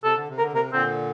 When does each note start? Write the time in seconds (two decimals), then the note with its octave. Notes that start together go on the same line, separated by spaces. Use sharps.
0.04 C3 A4
0.16 D3
0.28 C3
0.38 D3 A#4
0.53 C3 A#4
0.73 A#2 D3 C4